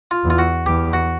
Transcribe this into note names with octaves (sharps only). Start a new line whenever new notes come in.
F4
E2
F4
F#4
E2 G4
F#4